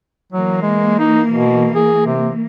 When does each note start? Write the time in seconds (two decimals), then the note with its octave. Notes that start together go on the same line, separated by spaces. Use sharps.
0.32 E3 F#3 A#3
0.62 G#3
0.99 D#4
1.32 B2
1.75 G#4
2.06 C3